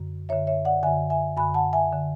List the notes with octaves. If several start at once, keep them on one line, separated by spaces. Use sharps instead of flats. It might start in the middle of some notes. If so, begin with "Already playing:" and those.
Already playing: F#2 D3
F#2 D3 C#5 E5
C#5 E5
D5 F#5
F#2 D3 E5 G#5
E5 G#5
F#2 D3 G#5 B5
F#5 A5
E5 G#5
D3